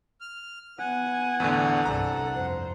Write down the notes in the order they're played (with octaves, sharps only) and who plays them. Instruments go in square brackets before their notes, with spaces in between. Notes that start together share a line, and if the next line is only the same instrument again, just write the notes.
[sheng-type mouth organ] F6
[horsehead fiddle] B3 G#5 [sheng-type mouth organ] F#5
[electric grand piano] E2 A2 D3
[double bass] C2 G2 [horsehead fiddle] G3 A4 [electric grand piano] A#5
[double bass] F2 [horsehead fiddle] C5